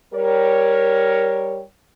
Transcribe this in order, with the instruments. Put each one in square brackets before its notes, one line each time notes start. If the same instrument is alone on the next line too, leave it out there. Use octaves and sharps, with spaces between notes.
[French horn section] G3 A#4 C#5